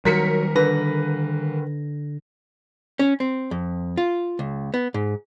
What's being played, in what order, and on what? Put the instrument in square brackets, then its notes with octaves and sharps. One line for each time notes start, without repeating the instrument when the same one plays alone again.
[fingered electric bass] D#3 G3 [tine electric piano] F#3 [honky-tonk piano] A#4 B6 C#7
[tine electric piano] D3 A#6 [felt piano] B4
[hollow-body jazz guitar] C#4
C4
F2
F4
C#2
B3
G#2